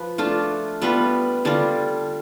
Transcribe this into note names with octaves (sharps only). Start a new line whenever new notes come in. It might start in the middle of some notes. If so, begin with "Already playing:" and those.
Already playing: F3 B4
A3 D4 F4
G3 B3 F4 B4
D3 G3 D4 F4